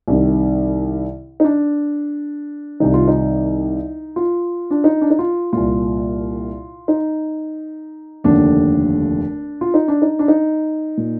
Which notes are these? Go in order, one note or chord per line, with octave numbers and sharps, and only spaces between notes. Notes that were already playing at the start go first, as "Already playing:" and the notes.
C2 C3 D#3
D#4
D4
C2 C3 D#3 D#4
F4
D#4
F4
D4
D#4
D4
D#4
F4
C2 A#2 F4
D#4
F1 D#2 D3 D4
F4
D#4
D4
D#4
D4
D#4
A#2